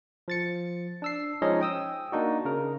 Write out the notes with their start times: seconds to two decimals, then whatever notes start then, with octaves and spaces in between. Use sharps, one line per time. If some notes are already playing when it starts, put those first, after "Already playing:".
0.28 F3 A6 C#7
1.02 D4 E6 C7
1.42 F3 G#3 C#4 D#4 C#5 D#5
1.61 G5 D#6 E6
2.12 A#3 D4 D#4 F#4
2.45 C#3 A#4